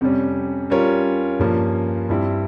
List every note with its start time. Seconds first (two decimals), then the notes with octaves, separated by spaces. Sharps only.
0.01 F2 C3 G3 C#4
0.70 G3 C#4 F4 A#4 C#5
1.39 G2 F3 A#3 C#4
2.09 G2 G3 C4 E4